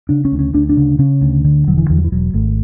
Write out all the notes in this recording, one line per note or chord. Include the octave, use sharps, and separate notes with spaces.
C#3 D4
C#4
D2
C#4
D2 D4
D4
C#3
C#3 C#4
D2
D3
E1 F#3
E3
E2 E3
F#3
E3
E1 F#3
G#1 A3